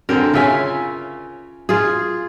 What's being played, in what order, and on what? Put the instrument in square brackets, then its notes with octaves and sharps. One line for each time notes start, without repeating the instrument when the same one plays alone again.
[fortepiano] F#2 D3 C4 [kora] A#4
[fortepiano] C#3 C#4 G#5 [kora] F4 E5
[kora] F4 G#4